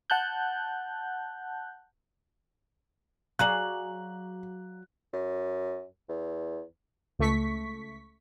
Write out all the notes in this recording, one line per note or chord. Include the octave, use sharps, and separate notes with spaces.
F#5 A5 F#6 G6
F#3 G#4 D5 F5 A#5 F#6 F#7
F#2
E2
C#2 A3 C#6 B6